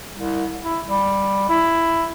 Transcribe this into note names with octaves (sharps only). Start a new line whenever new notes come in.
C2
E4
G3
E4